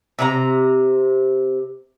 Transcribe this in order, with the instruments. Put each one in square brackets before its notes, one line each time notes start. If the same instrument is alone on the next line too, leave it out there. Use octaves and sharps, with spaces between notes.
[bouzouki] C3 G4 A#5